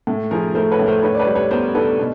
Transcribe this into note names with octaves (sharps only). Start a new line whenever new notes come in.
A2
F3 G#4 A#4
A3 A#4 C5
B4 C#5
A2
A#4 C5
D3 B4 C#5
D5
B4 C#5
G3
B4 C#5
B3 A#4 C5
D3 A4 B4
B2